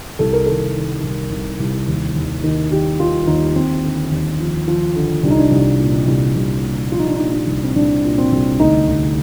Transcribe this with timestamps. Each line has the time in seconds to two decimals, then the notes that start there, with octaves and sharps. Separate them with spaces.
0.19 C2 A4
0.33 A#4
0.46 D#3 A4
0.76 D#3
1.03 C2
1.31 C2
1.60 C2
1.88 D#2
2.15 D#2
2.44 D#3
2.72 D#3 G4
3.00 D#3 F4
3.27 D#2 D#4
3.55 D#2 C4
3.84 D3
4.11 D#2
4.40 F3
4.68 F3
4.96 D3
5.23 C2 D4
5.31 D#4
5.38 D4
5.51 C2
5.79 A#2
6.07 C2
6.36 C2
6.64 A#2
6.91 F3 F4
6.99 D#4
7.07 D4
7.16 D#4
7.19 A#2
7.33 D#4
7.47 C2
7.64 C4
7.76 C2 D4
8.04 A#2
8.18 C4
8.32 C2
8.60 D2 D#4
8.88 D2